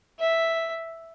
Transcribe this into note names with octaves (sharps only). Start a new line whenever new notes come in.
E5